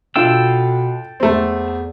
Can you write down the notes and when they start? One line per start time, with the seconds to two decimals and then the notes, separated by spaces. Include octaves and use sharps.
0.16 B2 D4 F4 A4 G5 E6
1.20 E2 A3 C4